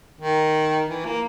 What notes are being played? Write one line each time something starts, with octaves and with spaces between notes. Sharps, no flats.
D#3
E3
A#3